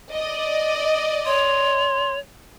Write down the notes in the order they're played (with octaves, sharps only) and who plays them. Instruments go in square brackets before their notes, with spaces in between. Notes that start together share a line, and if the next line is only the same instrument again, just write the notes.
[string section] D5 D#5
[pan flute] C#5 [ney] C6